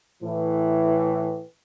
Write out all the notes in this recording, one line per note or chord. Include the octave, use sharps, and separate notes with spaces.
A2 E3